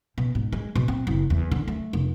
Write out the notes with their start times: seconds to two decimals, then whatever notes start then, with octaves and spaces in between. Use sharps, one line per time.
0.18 B2
0.35 G#2
0.53 G#3
0.76 B2
0.88 C4
1.07 F#1
1.30 E2
1.52 D3
1.68 A3
1.93 F1